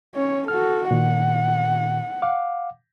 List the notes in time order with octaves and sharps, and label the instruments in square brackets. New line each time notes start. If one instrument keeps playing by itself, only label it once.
[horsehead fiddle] C#4 C#5
[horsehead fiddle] F#4 A4 [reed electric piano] F6
[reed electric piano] A#2 D#3 [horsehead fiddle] F#5
[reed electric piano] F5 F#5 D6